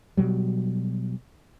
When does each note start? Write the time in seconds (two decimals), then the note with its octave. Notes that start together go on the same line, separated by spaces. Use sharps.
0.17 B2 F#3 G3